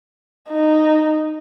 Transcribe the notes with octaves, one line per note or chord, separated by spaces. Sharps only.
D#4